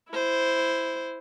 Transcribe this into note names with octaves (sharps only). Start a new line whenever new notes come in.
E4 C5